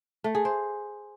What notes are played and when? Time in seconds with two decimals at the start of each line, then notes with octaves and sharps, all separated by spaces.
0.24 A3
0.35 G#4
0.45 C5